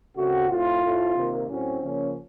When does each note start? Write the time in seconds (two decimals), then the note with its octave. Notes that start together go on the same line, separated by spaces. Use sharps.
0.16 C#3 A3 C4 F#4
0.49 A2 A3 C4 F4
0.83 A2 A3 C4
1.16 C3 D#3 A#3
1.48 A2 F#3 C4 C#4
1.81 C#3 F3 A#3 C#4